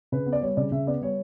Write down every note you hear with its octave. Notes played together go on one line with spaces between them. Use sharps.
C#3 B4
B3
D5
G3 C#5
C#3 D5
C#3 E5
B3 D5
G3 C#5